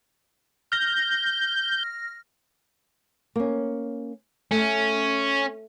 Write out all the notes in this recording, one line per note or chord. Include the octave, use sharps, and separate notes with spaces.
F6 G6 A#6
A#3 C#4
A3 C#4